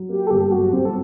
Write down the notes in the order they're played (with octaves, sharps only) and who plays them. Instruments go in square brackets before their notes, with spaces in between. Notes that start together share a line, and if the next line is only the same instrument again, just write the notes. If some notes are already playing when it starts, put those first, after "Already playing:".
Already playing: [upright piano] F#3
[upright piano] A#3 [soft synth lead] G4
[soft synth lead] A4
[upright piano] G1 [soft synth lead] G4
[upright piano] F#3 [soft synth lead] F#4
[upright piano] G1 [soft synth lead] C4
[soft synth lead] A4